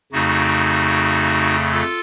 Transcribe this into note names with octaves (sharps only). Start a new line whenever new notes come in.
F2 C#3 A3 D#4 F#4
F4 A4